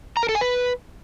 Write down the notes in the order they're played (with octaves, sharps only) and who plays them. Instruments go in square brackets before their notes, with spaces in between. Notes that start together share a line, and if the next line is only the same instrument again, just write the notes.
[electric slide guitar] A#5
A#4
A4
G#5
B4